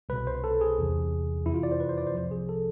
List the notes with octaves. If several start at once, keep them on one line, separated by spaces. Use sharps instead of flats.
C2 B2 B4
C5
A4
G#4
E2 C3 E3
F2 C3 E3 E4
F4
D5
C5
B4
C5
D5
C5
C2 C3 F3
G#4
A4